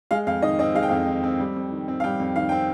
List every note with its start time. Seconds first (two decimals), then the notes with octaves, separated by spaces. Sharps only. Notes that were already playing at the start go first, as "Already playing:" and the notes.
0.11 G#3 F5
0.27 F2 F5
0.42 D#3 D#5
0.59 C4 D#5
0.75 G#3 F5
0.83 G5
0.89 F2 F5
1.07 D#3
1.23 C4
1.40 G3
1.56 F2
1.72 D#3
1.88 C4
2.00 F5
2.04 G3 G5
2.20 F2
2.36 D#3 F5
2.49 C4 G5